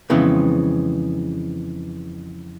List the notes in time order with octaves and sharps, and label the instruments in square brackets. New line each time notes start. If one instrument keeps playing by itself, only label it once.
[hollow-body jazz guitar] F2 C#3 E3 G#3 B3 C4